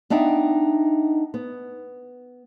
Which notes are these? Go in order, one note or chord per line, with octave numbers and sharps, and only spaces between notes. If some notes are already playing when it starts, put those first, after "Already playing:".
B3 D4 D#4 E5 G5
B3